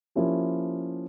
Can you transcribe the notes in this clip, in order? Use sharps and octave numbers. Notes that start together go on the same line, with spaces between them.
F3 A#3 C#4 E4 G4